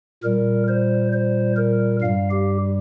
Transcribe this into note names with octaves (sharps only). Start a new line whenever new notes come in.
A#2 G3 A#4
C5
C5
A#4
G2 G3 F5
G4